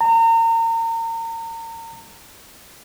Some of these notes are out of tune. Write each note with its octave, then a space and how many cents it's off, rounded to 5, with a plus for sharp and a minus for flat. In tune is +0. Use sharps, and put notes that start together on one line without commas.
A#5 -35